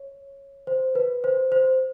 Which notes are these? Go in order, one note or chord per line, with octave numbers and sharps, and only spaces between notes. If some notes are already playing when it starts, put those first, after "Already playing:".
Already playing: C#5
C5
B4
C5
C5